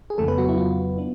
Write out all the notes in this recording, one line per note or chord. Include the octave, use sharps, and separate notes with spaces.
G#4
F2 C#3 E3 A3 A4
B3 B4
F#3 F#4
E4
F4
B3 D4